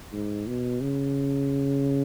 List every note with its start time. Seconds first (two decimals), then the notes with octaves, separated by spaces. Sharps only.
0.13 G#2
0.47 B2
0.81 C#3